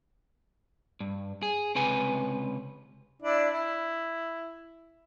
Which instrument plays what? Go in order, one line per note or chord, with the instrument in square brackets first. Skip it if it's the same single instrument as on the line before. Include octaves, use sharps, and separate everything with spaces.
[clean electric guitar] G2
G#4
C#2 C3 B4 G#5
[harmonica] D4 E4 D5
E4